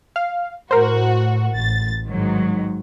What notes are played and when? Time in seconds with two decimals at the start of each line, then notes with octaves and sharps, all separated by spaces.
0.16 F5
0.71 A2 F#4 A#4 C5
1.53 A1 A6
2.07 G#2 D#3 F#3